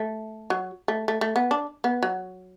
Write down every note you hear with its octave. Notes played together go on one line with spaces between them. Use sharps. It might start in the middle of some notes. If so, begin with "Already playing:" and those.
Already playing: A3
F#3
A3
A3
A3
B3
D4
B3
F#3